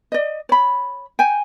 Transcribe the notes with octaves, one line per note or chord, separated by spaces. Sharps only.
D5 D#5
C#5 B5
G5 G#5